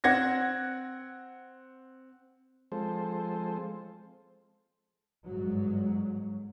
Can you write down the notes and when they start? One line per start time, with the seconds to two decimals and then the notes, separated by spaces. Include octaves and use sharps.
0.04 C4 F#5 G#6 A#6
2.72 F3 G#3 C4 A4 C5
5.25 G1 G#2 F#3